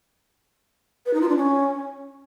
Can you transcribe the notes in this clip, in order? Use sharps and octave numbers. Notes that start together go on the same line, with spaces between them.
B4
D#4
F4
D4
C#4